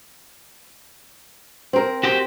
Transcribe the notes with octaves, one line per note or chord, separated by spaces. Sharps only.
C4 A#4
F#4 G4 C5